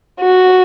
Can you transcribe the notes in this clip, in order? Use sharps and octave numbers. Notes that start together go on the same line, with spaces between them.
F#4